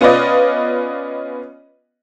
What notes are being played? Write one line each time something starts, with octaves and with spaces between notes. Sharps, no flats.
B3 C#4 F4 B4 D5 D#5